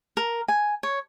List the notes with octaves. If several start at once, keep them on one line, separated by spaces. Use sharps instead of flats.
A#4
G#5
C#5